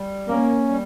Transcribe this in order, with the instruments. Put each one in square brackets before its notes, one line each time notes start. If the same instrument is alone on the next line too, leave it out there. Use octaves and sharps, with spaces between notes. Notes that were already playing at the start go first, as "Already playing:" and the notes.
Already playing: [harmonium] G3
[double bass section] A#3 [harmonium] C#4
[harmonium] G3